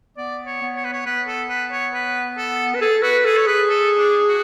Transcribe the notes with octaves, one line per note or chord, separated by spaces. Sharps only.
B3 D5
C#5
B3
C#5
B4
C#5
B3 B4
A4
B4
C#5
B4
A4
B4
G#4 A4
F#4 B4
G#4 A4
C#5
G#4 B4
A4
D4
F#4